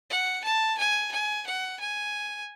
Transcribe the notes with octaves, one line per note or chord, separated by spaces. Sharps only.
F#5
A5
G#5
G#5
F#5
G#5